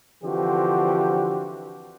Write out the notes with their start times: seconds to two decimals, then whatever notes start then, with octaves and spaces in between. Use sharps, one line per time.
0.24 D3 E3 F3 C4 F#4 G4